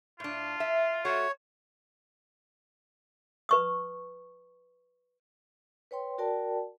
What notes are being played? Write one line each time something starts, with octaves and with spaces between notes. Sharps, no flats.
A2 D4 F4
E5
A3 F#4 C#5
B4 C#6 D#6
B4 C#5 G5 C6
F#4 A#4 D5 G5 A5